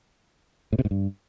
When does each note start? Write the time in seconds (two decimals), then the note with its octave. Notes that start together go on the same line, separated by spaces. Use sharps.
0.73 A2
0.79 C3
0.85 G#2
0.91 G2